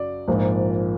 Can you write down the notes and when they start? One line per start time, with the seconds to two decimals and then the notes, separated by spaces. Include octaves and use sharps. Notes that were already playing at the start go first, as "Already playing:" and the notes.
Already playing: F#2 C#3 F#3 D5
0.28 A#1 G#2 F3 A#3